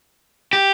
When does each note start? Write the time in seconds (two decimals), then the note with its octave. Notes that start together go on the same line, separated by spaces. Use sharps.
0.53 G4